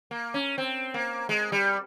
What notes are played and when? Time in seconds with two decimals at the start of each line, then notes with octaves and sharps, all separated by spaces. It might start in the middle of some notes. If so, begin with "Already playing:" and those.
0.11 A#3
0.34 C#4
0.58 C4
0.94 A#3
1.29 G#3
1.52 G3